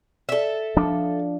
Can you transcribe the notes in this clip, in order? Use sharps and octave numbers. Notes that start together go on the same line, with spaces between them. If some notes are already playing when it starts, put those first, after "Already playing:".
A4 E5
F3 D4